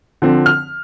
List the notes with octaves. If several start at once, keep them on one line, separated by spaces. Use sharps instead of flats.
D3 F3 C4
F6